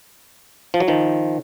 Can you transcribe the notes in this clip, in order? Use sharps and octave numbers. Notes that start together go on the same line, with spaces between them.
F3
F#3
D#3 F3